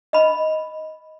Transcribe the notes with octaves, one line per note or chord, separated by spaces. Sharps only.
D#5 B5